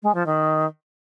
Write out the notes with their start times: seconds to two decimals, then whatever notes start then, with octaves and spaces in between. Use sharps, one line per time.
0.03 G#3
0.15 F3
0.26 D#3